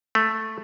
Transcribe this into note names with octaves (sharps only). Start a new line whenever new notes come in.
A3